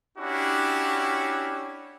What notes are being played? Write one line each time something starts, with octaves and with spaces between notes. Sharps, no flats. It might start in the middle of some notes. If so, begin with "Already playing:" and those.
C#4 D4 E4 F#4 G4